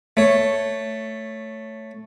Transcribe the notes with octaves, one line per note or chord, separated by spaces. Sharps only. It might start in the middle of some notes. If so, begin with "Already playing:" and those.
A3 C#5